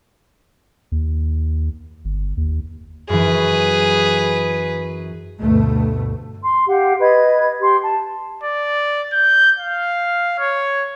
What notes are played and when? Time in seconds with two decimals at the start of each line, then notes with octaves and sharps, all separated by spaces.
0.92 D#2
2.05 G1
2.37 D#2
3.09 F#2 E3 G#4 B4
5.40 D2 G2 B2 A3
6.43 C6
6.68 G4 F5 F#5
7.00 B4 D#5 G#6
7.61 G4 C6
7.81 A5
8.44 D5
9.13 G6
9.58 F5
10.39 C#5